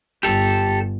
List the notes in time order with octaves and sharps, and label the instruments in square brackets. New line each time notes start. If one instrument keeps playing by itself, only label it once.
[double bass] G1 [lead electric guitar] G4 A4